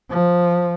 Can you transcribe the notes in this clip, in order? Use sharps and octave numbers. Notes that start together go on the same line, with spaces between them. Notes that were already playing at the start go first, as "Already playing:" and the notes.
F3